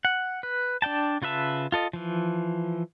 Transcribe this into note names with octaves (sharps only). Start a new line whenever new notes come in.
F#5
B4
D4 D5 G5 A5
C#3 F4 B4 E5 A5
F4 A4 D#5
E3 F3